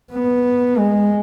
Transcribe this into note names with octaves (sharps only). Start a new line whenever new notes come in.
B3
G#3